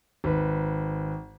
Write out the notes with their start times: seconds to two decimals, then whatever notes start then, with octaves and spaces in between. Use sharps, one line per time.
0.24 G#1 B4